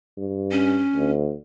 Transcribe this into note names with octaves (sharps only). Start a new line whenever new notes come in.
G2
C#4
D2